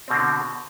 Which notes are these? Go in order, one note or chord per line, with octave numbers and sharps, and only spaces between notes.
B2 D3 C4